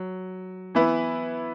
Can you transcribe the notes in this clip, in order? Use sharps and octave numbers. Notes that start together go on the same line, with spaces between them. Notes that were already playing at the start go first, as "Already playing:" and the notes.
Already playing: F#3
E3 B3 E4 B4